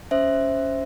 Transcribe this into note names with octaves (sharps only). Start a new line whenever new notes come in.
C#4 C5 E5